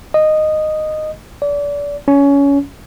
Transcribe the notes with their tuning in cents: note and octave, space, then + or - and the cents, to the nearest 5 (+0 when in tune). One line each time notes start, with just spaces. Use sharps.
D#5 -10
D5 -30
C#4 +20